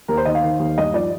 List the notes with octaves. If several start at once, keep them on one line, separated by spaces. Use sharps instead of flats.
D#2 A#4
C5
D#3 D#5
F5
D#3
D#2
G2 D#5
F3 D5